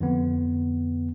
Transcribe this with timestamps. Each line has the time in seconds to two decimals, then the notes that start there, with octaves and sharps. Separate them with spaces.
0.01 F2 D3 B3